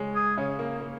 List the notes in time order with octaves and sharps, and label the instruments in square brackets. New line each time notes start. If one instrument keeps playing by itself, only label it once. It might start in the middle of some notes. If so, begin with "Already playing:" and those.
Already playing: [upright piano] C#3 G#3 C#4
[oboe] G#4
[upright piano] C#3 C#4
A#3
A#3